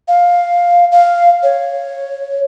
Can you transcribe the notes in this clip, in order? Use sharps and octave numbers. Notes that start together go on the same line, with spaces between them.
F5
F5
C#5